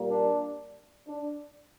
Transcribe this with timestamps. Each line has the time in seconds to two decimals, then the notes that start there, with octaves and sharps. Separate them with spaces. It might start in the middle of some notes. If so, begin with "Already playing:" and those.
Already playing: A#2 G3 A#3
0.10 D4
1.08 D4